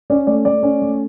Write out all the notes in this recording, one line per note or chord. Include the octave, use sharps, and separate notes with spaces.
C#4 D5
A3 D5
A3 D5
C#4
A3